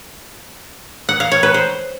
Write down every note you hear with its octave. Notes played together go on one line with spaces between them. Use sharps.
F#5
F5
C#5
B4
C5